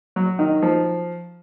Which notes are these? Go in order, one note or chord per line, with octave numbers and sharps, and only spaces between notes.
F#3
D#3
F3